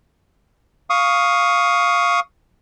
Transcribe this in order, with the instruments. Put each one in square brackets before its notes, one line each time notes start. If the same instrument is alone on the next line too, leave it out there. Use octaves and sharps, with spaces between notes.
[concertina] F5 C#6 D#6